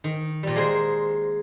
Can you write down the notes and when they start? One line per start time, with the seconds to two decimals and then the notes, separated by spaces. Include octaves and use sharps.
0.04 D#3
0.43 A#2 G3
0.56 G#3 A#3 G#4 A#4 C5